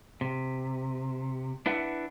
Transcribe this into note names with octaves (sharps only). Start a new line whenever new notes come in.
C3
D4 E4 B4 E5 F#5